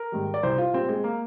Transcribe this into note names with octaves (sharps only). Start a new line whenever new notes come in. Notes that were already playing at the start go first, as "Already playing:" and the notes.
Already playing: A#4
G#2 D#3 G3
D5
C2 C5
F4
A#2 G3 C4
G#3
A#3